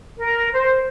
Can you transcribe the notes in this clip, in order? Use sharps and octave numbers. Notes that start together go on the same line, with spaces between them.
A#4
C5